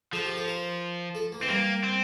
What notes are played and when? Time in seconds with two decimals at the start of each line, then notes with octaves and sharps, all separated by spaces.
0.13 F3 A4
0.25 G4
0.36 A4
0.48 A#4
1.15 A4
1.32 A#3
1.40 E3 C4
1.49 G3 A#3
1.84 C4